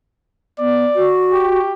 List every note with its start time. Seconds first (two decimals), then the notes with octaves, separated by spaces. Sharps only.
0.59 B3 D5
0.96 F#4
1.32 G4